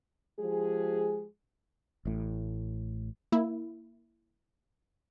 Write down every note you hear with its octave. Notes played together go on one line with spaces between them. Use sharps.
F3 G#3 G4 G#4
A1 A2
A#3 E4